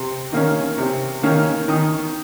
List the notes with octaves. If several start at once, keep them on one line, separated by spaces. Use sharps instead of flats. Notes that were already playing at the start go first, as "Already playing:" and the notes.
Already playing: C3 C6
D#3 A#3 C#4
C3
D#3 A#3 C#4
D#3 D#6